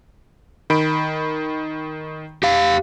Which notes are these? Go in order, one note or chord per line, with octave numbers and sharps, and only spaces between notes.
D#3 B5 D7
G4 F5